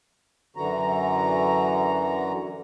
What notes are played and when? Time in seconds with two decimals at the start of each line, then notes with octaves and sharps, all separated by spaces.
0.56 F#2 D3 E3 F#4 A#5